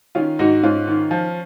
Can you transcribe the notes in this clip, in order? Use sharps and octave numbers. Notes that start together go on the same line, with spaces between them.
D#3 C#4 F4
G#2 D#4 F#4
G#2 C#4 F4
D#3
F3